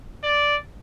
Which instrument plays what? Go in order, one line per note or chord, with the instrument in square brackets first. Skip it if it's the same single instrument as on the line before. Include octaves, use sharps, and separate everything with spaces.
[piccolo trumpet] D5